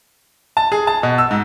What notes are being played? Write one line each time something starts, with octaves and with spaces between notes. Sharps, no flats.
A5
G#4
A5
B2
E6
G#2